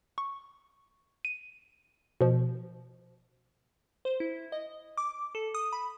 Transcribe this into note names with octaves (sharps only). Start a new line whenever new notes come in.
C#6
D#7
B2 F3
C5
E4
D#5
D6
A4
D#6
B5